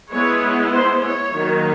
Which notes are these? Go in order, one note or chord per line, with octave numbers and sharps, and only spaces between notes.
G#3 B3 E4 C#5
C5
C#5
D#3 F#3 A#3